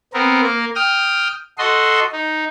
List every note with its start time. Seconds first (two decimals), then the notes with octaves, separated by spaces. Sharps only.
0.13 B3 C4 A#4
0.43 A#3 A#4
0.75 G5 D#6 F6
1.58 F#4 A4 D#5 C6
2.12 D#4